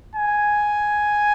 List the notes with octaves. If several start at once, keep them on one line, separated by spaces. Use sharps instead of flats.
G#5